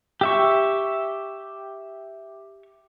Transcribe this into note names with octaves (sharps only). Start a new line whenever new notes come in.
G4 E5 C#6